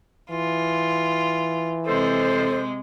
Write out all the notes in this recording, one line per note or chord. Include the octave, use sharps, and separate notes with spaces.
E3 F4
C3 G#3 A4 C5